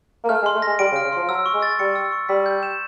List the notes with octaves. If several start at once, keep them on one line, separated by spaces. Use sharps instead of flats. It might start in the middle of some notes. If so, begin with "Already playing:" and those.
A#3
A3 F6
G#3
C6
A3
G#3 A#6
G3 D7
C#3
F6
C#3
F3 C6
F#3 E6
C#6
G#3
A6
G3 C#7
E6
C#6
G3 B6
G6
E7